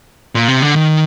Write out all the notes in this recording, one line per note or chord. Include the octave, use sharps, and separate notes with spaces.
A#2
C3
D3
D#3